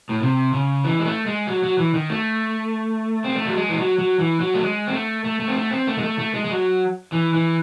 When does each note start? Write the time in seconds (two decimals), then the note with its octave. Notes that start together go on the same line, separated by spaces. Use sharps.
0.09 A2
0.22 C3
0.53 C#3
0.84 E3
0.99 G#3
1.05 A3
1.26 G#3
1.47 F#3
1.63 F#3
1.78 E3
1.94 D#3
2.10 A3
3.24 C4
3.35 A3
3.46 F#3
3.57 G#3
3.69 E3
3.78 F#3
3.98 F#3
4.19 E3
4.40 F#3
4.54 A3
4.62 G#3
4.87 C4
4.93 A3
5.24 A3
5.40 A3
5.48 C4
5.55 A3
5.71 C4
5.87 A3
5.98 G#3
6.03 A3
6.19 A3
6.34 G#3
6.44 G#3
6.50 F#3
7.12 E3
7.34 E3